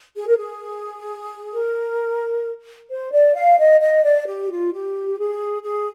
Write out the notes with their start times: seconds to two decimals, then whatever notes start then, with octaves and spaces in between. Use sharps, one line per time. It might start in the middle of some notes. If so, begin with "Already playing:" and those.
0.15 G#4
0.27 A#4
0.37 G#4
1.53 A#4
2.90 C5
3.12 D5
3.35 F5
3.58 D#5
3.80 D#5
4.04 D5
4.26 G4
4.50 F4
4.72 G4
5.18 G#4
5.62 G#4